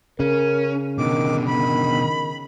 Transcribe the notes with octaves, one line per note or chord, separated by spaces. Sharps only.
C#3 C#4 A#4
B2 D3 D#3 D6
D#3 B5